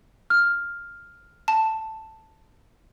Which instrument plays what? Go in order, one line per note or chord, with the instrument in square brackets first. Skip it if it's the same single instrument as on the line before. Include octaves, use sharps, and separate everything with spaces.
[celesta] F6
[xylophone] A5